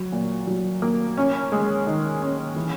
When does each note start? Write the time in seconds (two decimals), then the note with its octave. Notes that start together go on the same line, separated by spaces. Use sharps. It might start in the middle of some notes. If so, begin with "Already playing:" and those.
Already playing: F#3
0.12 A#2
0.47 F#3
0.82 A#3
1.17 C#4
1.52 G#3
1.87 D#3
2.22 C#4
2.56 E3